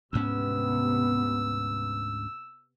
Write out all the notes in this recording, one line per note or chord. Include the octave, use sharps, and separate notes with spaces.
D2 G#2 C3 B3 C#4 E6